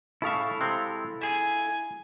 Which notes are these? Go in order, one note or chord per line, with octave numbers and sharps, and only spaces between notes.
A2 C#3 E4 A4 E5 F5
C3 G#3 C4
G#4 E5 G#5